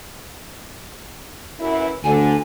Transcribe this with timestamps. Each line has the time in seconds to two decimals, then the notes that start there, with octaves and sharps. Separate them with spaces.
1.59 F#2 E3 E4
2.04 D2 D3 G#5